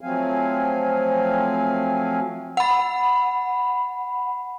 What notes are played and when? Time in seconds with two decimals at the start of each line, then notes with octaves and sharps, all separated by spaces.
0.01 F3 F#3 A3 C4 F5 G#5
2.57 F#5 B5